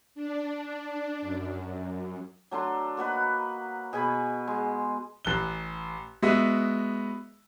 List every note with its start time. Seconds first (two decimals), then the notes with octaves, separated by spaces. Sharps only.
0.15 D4
1.22 F#2
2.51 F#3 A3 D4 C6
2.97 A#3 F#4 B4 D#5
3.93 B2 G#4 G#5 B5
4.47 G#3
5.25 A1 F#6 G7
6.22 G#3 B3 F#4 D#5 E5